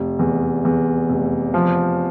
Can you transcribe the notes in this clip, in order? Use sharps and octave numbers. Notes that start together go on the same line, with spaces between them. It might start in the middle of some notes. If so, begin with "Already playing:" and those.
Already playing: F1
E2
E2
F1
F3